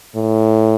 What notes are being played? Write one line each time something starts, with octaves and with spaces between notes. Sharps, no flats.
A2